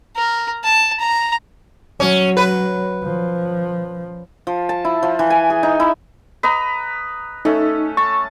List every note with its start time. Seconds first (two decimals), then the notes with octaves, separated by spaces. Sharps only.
0.16 A#4
0.64 A5
1.00 A#5
2.00 F#3 C#4
2.37 B4
3.04 F3
4.47 F3
4.69 A5
4.85 E4
5.03 F3
5.19 E3
5.30 G#5
5.50 G#4
5.63 D#4
5.80 E4
6.43 B4 D#5 A#5
7.45 A3 C#4 D#4 A4
7.97 A5 C#6